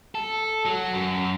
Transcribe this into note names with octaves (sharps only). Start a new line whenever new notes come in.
A4
F#3
F#2